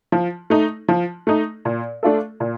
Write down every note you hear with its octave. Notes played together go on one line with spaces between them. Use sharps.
F3
A3 D#4
F3
A3 D#4
A#2
A3 D4 F4 A4
A#2